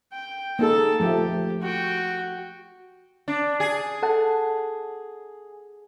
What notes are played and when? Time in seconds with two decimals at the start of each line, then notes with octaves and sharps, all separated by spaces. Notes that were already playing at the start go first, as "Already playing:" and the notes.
0.12 G5
0.59 A#3 D#4 G#4 A4 A5
1.00 F3 A3 G4
1.61 F#4 G5
3.28 D4
3.60 G#4
4.03 A4 F#5 A5